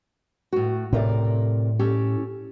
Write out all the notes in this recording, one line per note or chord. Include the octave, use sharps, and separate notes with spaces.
A2 F#4
A2 C3 A#4 D5
C#4 G4 A4